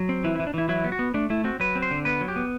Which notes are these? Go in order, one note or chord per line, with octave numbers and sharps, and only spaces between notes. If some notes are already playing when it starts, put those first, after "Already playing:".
Already playing: F#3
C4
E3 E4
E4
E3
D4
E3 E4
F#3 E4
B3
F#4
B3
A3 D4
A3 E4
C4 F#4
F#3 B4
C4
C5
D3
B3 B4
F#3
G4
B3